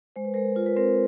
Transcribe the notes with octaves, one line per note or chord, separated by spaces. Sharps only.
G#3 C5
B4
G#3 A#4 C5
F4
B4
C4 A#4 C5